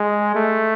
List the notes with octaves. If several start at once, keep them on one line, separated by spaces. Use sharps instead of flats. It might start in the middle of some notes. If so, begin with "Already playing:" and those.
Already playing: G#3
A3